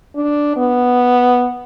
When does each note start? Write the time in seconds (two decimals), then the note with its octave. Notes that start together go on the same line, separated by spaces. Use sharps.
0.16 D4
0.56 B3